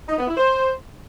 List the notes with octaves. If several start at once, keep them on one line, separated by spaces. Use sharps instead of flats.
D#4
B3
E4
C5